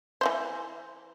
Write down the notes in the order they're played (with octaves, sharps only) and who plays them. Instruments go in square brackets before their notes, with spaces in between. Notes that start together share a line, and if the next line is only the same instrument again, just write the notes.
[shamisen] E3 G3 C5